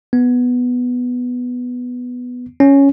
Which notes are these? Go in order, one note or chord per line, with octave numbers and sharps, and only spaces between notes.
B3
C#4